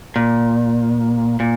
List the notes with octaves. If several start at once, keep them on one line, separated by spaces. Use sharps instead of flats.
A#2
A#2